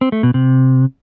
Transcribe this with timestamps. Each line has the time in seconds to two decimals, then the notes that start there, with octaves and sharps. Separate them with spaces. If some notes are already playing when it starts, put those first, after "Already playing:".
0.01 C4
0.12 A3
0.23 B2
0.34 C3